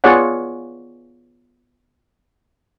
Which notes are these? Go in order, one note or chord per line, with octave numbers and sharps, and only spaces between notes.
B3 F4 G#4 C#5 D5 F#5